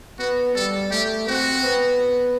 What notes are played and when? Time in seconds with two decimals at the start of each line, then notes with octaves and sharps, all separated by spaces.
0.19 B3 F#4
0.55 G3 A4
0.91 A3 G4
1.27 C4 F#4
1.64 B3